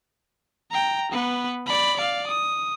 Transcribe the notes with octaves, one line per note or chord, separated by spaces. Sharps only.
G5 A#5
B3 B4
D5 B5
D5 F5
D#6